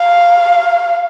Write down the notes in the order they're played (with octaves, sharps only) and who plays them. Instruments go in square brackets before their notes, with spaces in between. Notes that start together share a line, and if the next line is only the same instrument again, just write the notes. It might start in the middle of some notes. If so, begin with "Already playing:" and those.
Already playing: [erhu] F5